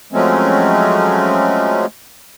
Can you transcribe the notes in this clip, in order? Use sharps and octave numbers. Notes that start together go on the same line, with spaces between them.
F3 F#3 G#3 A3 C4 C#4